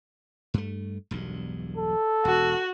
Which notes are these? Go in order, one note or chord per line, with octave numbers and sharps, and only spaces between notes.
G2 A3
E1 B1 G2
A4
E1 F#4